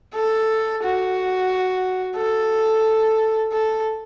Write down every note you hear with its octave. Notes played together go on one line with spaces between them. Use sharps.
A4
F#4
A4
A4